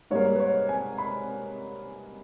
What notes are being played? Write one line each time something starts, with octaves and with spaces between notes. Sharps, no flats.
G#2 G3 A#3 C#5
B4
C#5
G#5
B5